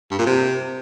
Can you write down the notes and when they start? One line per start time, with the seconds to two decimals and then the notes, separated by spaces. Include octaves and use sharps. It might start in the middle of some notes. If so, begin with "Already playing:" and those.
0.11 G2
0.19 A#2
0.26 C3